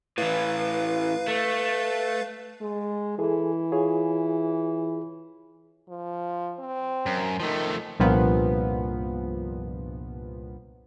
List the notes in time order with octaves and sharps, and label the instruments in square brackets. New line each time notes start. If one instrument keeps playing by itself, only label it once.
[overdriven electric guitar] A2 E3 [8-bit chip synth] B4 F5
[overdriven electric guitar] A3
[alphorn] G#3
[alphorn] E3 [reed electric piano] G#4 A4
[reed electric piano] F4 G#4 C#5
[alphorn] F3
C4
[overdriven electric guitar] F#2
[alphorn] D#3 [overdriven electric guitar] F3 A3
[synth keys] C2 G2 A#2 F3 B3